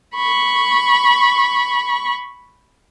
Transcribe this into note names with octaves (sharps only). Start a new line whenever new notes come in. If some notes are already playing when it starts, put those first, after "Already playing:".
B5 C#6